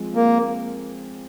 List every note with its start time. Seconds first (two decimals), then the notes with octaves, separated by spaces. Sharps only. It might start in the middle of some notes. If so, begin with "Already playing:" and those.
Already playing: F3 G#3 C4
0.15 A#3